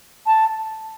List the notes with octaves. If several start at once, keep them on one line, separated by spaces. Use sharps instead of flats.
A5